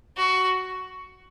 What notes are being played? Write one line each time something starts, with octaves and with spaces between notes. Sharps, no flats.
F#4